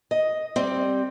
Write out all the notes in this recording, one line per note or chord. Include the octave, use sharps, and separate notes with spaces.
D#5
G3 C4